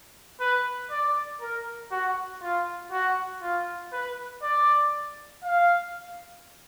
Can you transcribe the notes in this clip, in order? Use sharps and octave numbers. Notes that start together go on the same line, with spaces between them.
B4
D5
A#4
F#4
F4
F#4
F4
B4
D5
F5